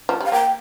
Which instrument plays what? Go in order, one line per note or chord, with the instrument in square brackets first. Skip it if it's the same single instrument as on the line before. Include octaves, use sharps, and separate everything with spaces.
[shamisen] F3
G3
[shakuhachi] F5
[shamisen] A#3 [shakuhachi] G5